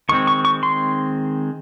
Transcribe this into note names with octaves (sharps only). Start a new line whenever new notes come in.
D#3 G#3 C4 C#6
C#6
C#6
C6